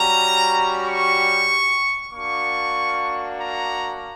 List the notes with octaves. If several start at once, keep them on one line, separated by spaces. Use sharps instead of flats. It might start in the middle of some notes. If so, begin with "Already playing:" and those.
Already playing: G3 C#4 F#4 A#5
C#6
A#3 D4 F#4 C#6
A#5